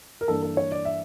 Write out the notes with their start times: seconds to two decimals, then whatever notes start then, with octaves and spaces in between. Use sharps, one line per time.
0.21 A#4
0.28 G2 E3 A#3 D4 A4
0.43 A4
0.57 C#5
0.72 D5
0.85 E5